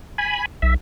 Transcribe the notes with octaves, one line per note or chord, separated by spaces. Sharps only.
G#5 B5
B1 E5